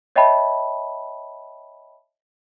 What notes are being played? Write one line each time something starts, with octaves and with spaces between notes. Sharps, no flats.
C#5 D#5 E5 G5 A5 B5